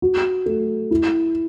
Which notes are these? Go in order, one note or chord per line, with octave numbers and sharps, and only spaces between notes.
F#4
A3
E4